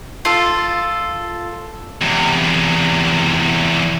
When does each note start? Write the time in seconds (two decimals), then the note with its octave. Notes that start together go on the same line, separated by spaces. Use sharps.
0.25 F4 A4
2.02 E2 C3